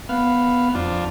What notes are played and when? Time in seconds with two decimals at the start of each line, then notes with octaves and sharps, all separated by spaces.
0.09 B3 F5
0.75 F2 D4 F4